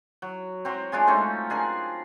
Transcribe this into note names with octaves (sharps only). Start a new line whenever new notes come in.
F#3
F#3 C4
G#3 D4 F4 G#4
A3 C4 C#4 D#4
D4 G#4 A#4